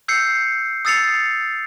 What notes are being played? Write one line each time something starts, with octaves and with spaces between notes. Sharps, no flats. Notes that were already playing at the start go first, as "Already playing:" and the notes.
E6 G6 C7 C#7
D#6 E6 A6 C7 C#7 F7